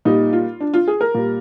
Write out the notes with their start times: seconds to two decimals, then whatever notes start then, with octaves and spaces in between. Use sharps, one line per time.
0.05 A#2 G3 D#4
0.33 F4
0.60 D4
0.74 F4
0.88 G#4
1.01 A#4
1.14 A#2 G3